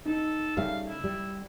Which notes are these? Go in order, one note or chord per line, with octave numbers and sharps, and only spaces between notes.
D#4 A4
C#3 G3 A3 F5
E4
G3